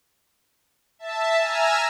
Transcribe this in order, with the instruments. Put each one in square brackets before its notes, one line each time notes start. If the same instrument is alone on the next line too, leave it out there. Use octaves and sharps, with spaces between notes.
[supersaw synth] E5 A5
G#5 A#5 E6 F6